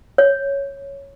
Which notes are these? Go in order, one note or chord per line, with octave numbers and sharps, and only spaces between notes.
C#5